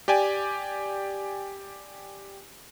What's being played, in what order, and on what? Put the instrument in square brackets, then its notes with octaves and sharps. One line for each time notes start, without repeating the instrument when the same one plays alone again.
[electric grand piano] G4 D5 G5 G#5